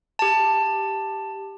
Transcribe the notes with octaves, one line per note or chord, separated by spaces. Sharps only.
G4 A5